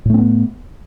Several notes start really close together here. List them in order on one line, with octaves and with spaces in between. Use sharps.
A2 A3 C4 B3